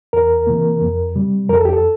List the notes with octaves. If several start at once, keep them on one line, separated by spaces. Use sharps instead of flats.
E2 A#4
C3 E3 A#3
F2
C3 G3
F2 A#4
A4
G4
A4